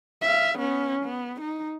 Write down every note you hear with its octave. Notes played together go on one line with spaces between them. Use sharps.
E5 F5
B3 C#4
B3
D#4